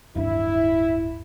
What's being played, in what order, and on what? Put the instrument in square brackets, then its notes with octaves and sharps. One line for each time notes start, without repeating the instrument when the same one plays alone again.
[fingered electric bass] D1 G2 D4 [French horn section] E4